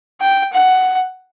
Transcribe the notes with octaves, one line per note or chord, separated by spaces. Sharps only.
G5
F#5